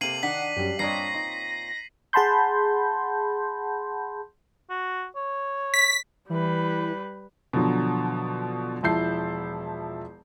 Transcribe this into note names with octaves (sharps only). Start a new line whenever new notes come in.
C3 A#3 A4 C7 D#7 F#7
D#3 D4 F#5 B6
F#2 G3 G4
G2 A#2 C4 D4 C#5 D#5 A#6 C7
D#4
G#4 F#5 A5 B5 C6 G6
F#4
C#5
B6
E3 G3 B4
B2 D3 F3 F#3
E1 F3 E4 A5 G6 C7